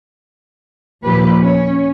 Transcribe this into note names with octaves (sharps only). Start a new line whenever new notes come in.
D#2 A#2 F3 G4 B4
C#4